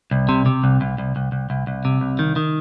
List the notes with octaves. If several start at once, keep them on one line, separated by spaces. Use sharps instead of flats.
C2
C3
C3
C2
C2
C2
C2
C2
C2
C2
C3
C2
D#3
D#3